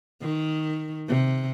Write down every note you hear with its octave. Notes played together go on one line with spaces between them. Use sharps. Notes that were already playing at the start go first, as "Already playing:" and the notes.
D#3
C3